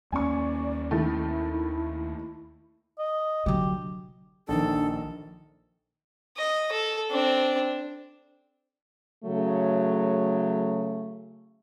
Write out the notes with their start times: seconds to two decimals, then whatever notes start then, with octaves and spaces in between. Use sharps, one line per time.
0.12 D#2 A#3 C#4 D5 G#5 C#6
0.91 D#3 A3 E4
2.98 D#5
3.46 D3 F#3 G4
4.48 A#1 D#3 D4 A4
6.37 D#5
6.72 A4
7.11 C4 D4
9.25 C#3 F#3 A3